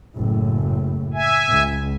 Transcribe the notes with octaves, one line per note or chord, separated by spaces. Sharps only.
F#1 A2
E5 G#5
C#2